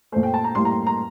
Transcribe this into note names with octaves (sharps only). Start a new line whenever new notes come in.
A#2 A3 C5
G5
A5
A#5
A2 G3 A#3 C6
A#5
A#5